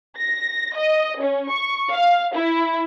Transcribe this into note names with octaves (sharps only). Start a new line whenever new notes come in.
A#6
D#5
C#4
C#6
F5
E4